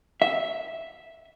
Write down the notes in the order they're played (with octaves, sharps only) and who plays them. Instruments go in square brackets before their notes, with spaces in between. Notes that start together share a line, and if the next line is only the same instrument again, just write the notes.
[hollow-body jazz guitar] E5